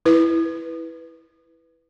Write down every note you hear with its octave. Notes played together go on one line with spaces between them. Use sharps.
E4 B4